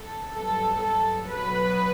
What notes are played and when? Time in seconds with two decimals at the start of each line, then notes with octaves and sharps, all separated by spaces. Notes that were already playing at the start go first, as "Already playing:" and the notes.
Already playing: A4
0.33 G2 F#3 B3 A4
0.81 A4
1.28 B2 F#3 B3 B4